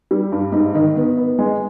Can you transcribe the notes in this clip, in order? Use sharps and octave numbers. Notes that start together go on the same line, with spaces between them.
G3
G2
G#2
D#3
B3
B3
G#3